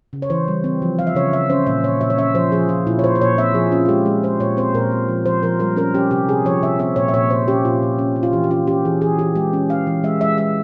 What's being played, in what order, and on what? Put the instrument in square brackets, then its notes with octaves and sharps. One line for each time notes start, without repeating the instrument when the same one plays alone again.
[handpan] C#3
C#5
E3 C5
G3
C4
F3
F3 F5
E5
C#3 C#5
C#3 E5
C#4 C5
A#2 E5
A#2 C#5
A#2 E5
C#5
C#4 E5
F3 C5
F3 G#4
F3 F4
A#2 E4
C#5
A#2 C5
C5
A#2 C#5
C4 E5
F3 G#4
C#4 F4
F4
G#3 G4
G#3
G#3 C5
A#2 C#5
C4 C5
A#2 A#4
C4
F3
F3 C5
F3 A#4
G3 A#4
C#4 A#4
C#4 G4
C3 G4
C3 G#4
F3 C#5
C3 E5
C4 E5
A#2 C#5
E5
A#2 C#5
A#2 C5
C#4 G4
A#2 F4
A#2
C#4
C#4
F4
E3 G4
G4
C#4 F4
C#4 G4
E3 G#4
E3 G#4
E3 G4
G#3 G4
C#4
C#4 F5
E3
G#3 E5
G#3 E5
G#3 E5